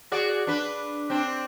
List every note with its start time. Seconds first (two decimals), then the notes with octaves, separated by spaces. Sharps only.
0.12 F#4 G#4 D5
0.47 D4 B4
1.10 C4 D4